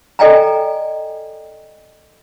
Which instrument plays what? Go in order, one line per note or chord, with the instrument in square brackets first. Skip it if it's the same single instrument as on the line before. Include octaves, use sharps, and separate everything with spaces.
[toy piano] A4 D5 D#5 G5 G#5 A#5